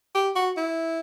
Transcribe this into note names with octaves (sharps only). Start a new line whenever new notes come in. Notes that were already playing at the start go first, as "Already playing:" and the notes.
G4
F#4
E4